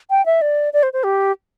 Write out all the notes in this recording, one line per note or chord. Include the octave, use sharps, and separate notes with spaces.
G5
E5
D5
D5
C5
C5
G4